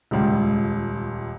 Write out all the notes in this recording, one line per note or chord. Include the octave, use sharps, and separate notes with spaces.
D#1 C#2